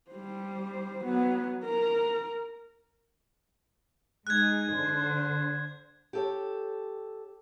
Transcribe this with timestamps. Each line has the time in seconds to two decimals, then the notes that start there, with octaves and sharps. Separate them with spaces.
0.11 G3 C5
1.04 F#3 B3
1.65 A#4
4.27 G#3 D#4 G#4 F#6 G#6
4.74 D3 C5
6.13 G4 A4 C#5